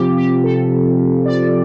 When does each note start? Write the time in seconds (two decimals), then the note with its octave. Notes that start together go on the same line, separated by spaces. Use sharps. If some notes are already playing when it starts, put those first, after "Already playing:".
Already playing: C3 F3 C4 F4 G4
0.16 G4
0.44 A4
1.26 D5